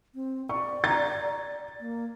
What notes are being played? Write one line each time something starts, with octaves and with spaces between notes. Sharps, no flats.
C4
D5 C#6
A#5 G#6 A6
A#3